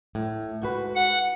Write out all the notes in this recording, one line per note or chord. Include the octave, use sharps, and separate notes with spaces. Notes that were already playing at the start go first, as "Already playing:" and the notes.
A2
G#2 F#4 B4
F#5